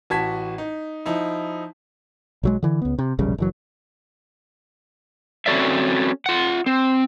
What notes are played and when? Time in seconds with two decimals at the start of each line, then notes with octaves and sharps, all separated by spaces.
0.10 A1 F#4 A5 G#6 B6
0.58 D#4
1.06 F3 D#4 E4
2.43 B1 F#3 G#3
2.62 D3 E3
2.82 C#2 B3
2.98 C3
3.19 E1 A#1 C#3 G3
3.38 F#1 E3 F#3
5.46 C4 C#4 F#4 A4 D5 E5
6.26 F4 F#5
6.66 C4